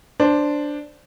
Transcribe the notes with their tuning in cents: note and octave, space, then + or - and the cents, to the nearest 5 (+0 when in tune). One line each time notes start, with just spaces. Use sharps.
D4 +0 C5 +0